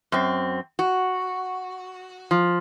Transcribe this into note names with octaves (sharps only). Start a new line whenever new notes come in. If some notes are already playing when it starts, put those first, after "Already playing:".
F#2 C4
F#4
F3